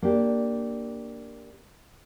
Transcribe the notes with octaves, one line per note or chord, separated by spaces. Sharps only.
A#3 D4 G4